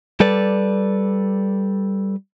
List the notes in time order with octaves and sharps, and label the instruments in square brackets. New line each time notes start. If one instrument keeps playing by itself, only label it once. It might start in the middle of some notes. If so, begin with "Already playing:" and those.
[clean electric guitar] G3 A4 B4 D5